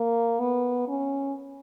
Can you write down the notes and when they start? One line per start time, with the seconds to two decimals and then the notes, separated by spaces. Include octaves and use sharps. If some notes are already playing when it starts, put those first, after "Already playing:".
Already playing: A#3
0.40 B3
0.88 C#4